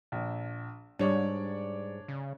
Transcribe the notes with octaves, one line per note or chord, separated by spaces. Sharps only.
A#1
G#2 G3 D4 C#5 D5
C#3